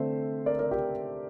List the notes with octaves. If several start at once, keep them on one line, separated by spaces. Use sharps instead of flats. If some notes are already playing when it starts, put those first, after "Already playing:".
Already playing: D3 A3 C4 C5 E5
A#4 D5
A#4 D5
G4 A#4